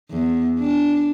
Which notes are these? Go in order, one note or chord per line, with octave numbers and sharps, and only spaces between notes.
E2
D4